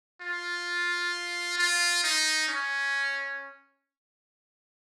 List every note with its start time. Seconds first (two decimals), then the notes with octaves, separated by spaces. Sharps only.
0.21 F4
1.58 F4
2.04 D#4
2.48 C#4